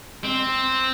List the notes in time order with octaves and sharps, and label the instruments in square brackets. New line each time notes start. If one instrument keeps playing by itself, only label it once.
[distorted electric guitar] C4